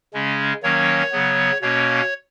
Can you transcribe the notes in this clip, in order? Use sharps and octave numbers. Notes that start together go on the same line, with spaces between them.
C#3 G#3 C#4
D#3 F#3 A#3 C#4 C#5
C#3 F#3 B3
B2 A#3 C#4 C#5